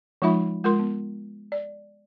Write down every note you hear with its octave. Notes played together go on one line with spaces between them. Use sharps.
F3 G#3 D#4 F4 E5 B5
G#3 F4 A#4 C6
B3
D5